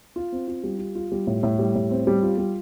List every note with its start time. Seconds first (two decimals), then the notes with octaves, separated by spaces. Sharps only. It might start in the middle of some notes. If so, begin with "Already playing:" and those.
0.16 F4
0.32 C4
0.48 F4
0.64 G3
0.79 F4
0.95 F4
1.12 G3
1.27 A2
1.43 A2
1.59 G3
1.75 A2
1.91 C4
2.07 G3
2.23 F4
2.38 G3